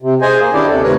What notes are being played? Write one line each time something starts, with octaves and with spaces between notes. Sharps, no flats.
C3
G#4 C5 D#5 G#5
A#3
D#3 C#4 D4 E4 G4 D5
D#2 C3 A4
D2 G#2 C3 A#4 B4 C#5